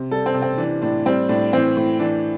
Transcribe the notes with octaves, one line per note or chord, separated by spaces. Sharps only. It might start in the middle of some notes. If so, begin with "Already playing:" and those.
Already playing: C3
G3 A4
C4
C3
C4
E3 D4
A2 D4
G3 C4
A2 D4
E3 C4
A2
E3 D4